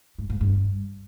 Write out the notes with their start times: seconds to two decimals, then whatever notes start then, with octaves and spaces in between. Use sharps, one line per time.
0.18 G#2
0.30 G#2
0.41 G2